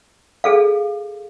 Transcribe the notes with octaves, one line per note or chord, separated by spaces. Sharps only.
G#4 A4 F5